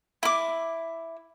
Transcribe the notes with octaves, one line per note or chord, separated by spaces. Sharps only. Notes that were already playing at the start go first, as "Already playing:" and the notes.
E4 D6